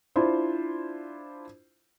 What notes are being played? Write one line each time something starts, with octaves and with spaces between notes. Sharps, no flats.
D4 E4 F4 C5